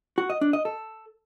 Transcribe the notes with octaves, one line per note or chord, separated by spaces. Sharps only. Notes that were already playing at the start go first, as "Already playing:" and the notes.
F#4
D#5
D4
D#5
A4